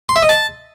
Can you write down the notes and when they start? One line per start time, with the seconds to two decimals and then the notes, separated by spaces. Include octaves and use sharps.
0.09 C6
0.16 E5
0.22 D#5
0.29 A5